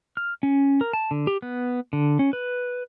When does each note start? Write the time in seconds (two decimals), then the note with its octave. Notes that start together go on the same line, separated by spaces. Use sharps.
0.17 F6
0.43 C#4
0.81 A#4
0.93 A5
1.11 D3
1.27 G4
1.42 B3
1.93 D3
2.19 C#4
2.33 B4